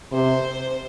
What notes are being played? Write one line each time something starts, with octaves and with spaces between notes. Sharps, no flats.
C3 C5